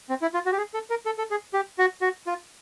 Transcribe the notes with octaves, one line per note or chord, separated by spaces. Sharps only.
C4
E4
F4
F#4
G4
G#4
A4
A#4
A4
A4
G#4
G4
F#4
F#4
F4